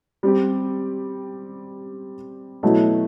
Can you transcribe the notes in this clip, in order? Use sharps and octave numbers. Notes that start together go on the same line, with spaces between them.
G3 C4 G4
B2 F#3 A3 E4